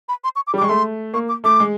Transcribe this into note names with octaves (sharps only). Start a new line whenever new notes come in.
B5
C6
C#6
D6
G3
D6
G#3 C#6
A3 C6
A#3 C#6
D6
A3 D6
G#3